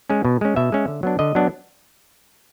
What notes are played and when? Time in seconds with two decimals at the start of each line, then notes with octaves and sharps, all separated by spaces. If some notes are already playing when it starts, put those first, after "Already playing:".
0.10 G#3 C#4
0.25 B2
0.41 G#3 C#4
0.56 B2 E5
0.72 G#3 C#4
0.88 D3
1.03 F#3 B3 D4
1.19 D3 D#5
1.35 F#3 B3 D4